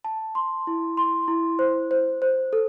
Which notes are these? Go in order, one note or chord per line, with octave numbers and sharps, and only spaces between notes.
A5
C6
E4
C6
E4
C5
C5
C5
A4